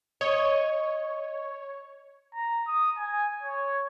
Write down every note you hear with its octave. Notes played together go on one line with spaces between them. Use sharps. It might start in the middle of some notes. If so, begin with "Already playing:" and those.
C#5 D#5
A#5
D#6
G#5
C#5